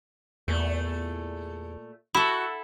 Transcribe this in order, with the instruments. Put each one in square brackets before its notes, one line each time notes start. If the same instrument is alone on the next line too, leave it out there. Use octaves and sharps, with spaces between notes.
[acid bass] E2 [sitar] A#2 A3
[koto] E4 A4 [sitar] F#4 [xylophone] B5